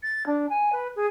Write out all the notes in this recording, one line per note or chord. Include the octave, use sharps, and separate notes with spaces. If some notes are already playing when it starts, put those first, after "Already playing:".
A6
D4
G#5
B4
G#4